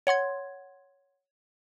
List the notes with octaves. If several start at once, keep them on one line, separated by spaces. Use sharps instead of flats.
C#5 F#5 C6 G#6